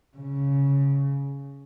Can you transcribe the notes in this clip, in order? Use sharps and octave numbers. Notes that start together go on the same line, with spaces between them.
C#3